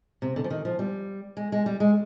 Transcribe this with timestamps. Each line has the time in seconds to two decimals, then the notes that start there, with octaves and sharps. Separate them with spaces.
0.22 C3
0.36 D3
0.44 F3
0.50 D#3
0.65 F3
0.79 G3
1.37 G#3
1.52 G#3
1.66 G3
1.80 G#3